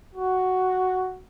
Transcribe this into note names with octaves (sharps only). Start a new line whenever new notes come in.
F#4